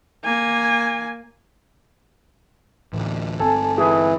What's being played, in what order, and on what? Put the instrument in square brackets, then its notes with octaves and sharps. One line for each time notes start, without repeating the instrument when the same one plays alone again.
[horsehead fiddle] A#3 G#5
[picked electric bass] A1 D2
[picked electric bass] G1 C4 [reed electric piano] A4 G#5 A5
[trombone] E3 [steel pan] G#4